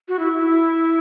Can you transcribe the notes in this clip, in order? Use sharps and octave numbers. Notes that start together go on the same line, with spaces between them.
F#4
E4
E4